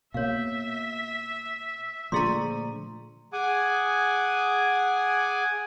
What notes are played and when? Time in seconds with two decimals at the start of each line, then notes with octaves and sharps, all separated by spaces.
0.14 B2 A#3 C#5 E5 F5
2.12 A#2 D3 F3 A3 G#4 A#5 C6
3.33 G#4 F#5 G#5 D6 D#6